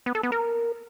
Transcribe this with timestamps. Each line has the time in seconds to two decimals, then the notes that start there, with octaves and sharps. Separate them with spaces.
0.06 B3
0.15 A4
0.23 B3
0.32 A#4